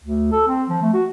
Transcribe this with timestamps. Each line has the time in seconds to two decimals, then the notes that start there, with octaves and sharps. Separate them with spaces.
0.04 D2
0.31 A4
0.48 C4
0.69 F3
0.82 A3
0.93 F#4